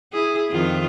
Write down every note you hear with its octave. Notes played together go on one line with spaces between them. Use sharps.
E4 G#4
F2 D#3 F4